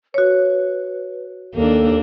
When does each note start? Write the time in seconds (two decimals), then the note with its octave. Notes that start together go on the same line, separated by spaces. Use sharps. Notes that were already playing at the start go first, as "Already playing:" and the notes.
0.14 F#4 B4 C#5
1.55 D#2 A#3 D4 A4